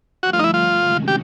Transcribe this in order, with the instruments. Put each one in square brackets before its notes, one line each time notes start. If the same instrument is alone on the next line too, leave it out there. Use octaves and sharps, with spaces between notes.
[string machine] G2 D3 F3 A3 [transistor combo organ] F#4
[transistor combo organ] F4
D#4
E4
F4
[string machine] C3 D#3 G#3 C#4 F#4
[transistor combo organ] G4